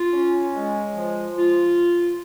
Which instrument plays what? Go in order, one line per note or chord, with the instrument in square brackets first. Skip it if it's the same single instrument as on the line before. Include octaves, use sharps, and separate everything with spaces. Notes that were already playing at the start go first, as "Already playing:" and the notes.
Already playing: [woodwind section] F4
C#4
G#3
F3
F4